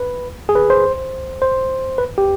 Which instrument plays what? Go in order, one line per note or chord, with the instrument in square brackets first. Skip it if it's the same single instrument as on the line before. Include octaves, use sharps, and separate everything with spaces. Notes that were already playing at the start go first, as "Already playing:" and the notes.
Already playing: [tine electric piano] B4
G#4
B4
C5
C5
B4
G4